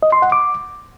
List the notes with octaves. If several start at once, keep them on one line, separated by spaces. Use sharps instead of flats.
D#5
C6
F#5
D6